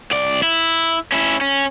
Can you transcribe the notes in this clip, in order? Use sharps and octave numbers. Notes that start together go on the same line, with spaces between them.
C2 D5
E4
C#4 E4
C#4